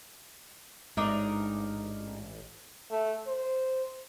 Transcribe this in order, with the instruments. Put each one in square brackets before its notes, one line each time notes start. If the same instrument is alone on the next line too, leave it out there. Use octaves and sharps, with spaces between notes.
[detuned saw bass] A1 [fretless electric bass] G#2 [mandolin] D4 D#4 A#4
[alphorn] A3
C5